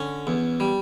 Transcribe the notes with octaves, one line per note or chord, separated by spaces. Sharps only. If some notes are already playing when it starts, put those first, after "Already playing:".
Already playing: D3 C#4
E2
G3